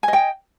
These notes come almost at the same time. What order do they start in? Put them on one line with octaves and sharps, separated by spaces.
G#5 D#5 G5